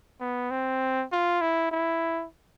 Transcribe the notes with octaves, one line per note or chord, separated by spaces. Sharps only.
B3
C4
F4
E4
E4